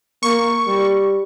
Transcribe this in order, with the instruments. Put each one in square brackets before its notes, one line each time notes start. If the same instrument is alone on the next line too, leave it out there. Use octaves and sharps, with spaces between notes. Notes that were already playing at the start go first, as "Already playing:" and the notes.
[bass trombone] A#3 [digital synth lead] C#6
[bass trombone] G3